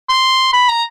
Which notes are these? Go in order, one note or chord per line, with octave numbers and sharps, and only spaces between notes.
C6
B5
A#5